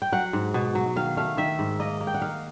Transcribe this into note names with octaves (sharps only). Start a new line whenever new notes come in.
G5
F#3 F#5
G#2
B2
F#3
D#3 F5
A3 F5
D#3 E5
G#2
A#3 D#5
A#3
G5
F#5
D#4 F5